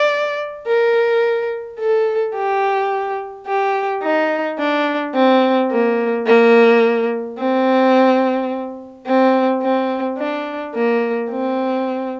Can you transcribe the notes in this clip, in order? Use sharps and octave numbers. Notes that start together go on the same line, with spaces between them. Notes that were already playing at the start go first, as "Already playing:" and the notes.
Already playing: D5
A#4
A4
G4
G4
D#4
D4
C4
A#3
A#3
C4
C4
C4
D4
A#3
C4